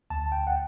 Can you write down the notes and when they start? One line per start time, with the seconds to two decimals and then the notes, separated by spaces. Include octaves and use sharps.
0.10 D2 A5
0.32 G5
0.47 F#5